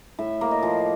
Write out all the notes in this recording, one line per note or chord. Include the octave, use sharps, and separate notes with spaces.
A2 E5
A#3
D#5
F3